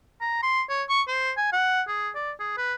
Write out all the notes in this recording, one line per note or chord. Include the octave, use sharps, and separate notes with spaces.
A#5
C6
C#5
C#6
C5
G#5
F#5
G#4
D5
G#4
B4